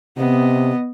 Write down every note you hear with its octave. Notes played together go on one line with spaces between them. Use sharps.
C3 B3 D#5